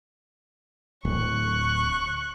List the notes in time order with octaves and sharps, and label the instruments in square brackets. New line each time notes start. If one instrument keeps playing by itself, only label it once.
[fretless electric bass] D1 [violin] C#6 F#6